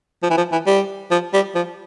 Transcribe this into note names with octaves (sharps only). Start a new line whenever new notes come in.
F3
E3
F3
E3
G3
F3
G3
F3